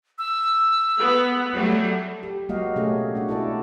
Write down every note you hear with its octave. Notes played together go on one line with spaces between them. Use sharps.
E6
B3
F#3 G3 A3
G4
F#3 G#3 A#3 F#4 D#5 F5
B2 A3 C#4 G4 G#4
D4 F#4
E4 A4 D5